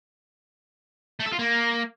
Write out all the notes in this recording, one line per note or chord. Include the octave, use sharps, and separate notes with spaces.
A3
A4
F4
A#3